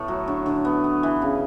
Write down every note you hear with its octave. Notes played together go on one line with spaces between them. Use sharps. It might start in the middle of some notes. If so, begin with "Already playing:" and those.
Already playing: A2 A3 B3
F#3
D3
D3
B3
B3
E3
C#3